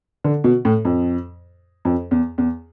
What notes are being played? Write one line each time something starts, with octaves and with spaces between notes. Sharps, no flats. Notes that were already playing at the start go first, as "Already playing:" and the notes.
D3
B2
A2
F2
F2
E2
E2